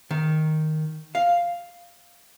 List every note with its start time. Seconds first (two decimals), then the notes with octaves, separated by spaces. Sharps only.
0.11 D#3
1.15 F5